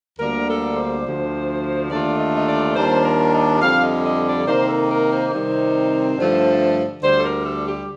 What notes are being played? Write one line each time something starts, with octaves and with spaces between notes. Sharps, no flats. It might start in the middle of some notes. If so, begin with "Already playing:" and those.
D2 D3 G3 A#3 A#4
A4
C5
D2 D3 F3
D#2 D3 A3 D4 F4 D5
D#5
D#5
D5
D#2 D#3 G3 D4 F4 C5
A#4
D#5
F2 D3 G3 F5
D#5
D#5
D5
C3 D#3 A#3 D#4 C5
A4
A#4
C5
C3 D#3 G3 C4 D#4
G2 D3 F3 A3
D2 D3 G3 C5
A4
A#4
A4
G4